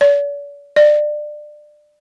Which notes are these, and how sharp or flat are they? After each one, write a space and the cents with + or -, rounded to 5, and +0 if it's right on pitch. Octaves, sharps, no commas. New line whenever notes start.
D5 -45
D5 +25